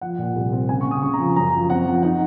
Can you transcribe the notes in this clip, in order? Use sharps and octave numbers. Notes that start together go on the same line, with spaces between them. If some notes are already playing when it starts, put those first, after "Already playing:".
F3 F#5
A#2
C2
C4
C#3 G#5
C#6
C#3 D#6
C#3 C#6
A#5
F3
F#2 A#5
F3
C4 F#5
F3
D#4 F#5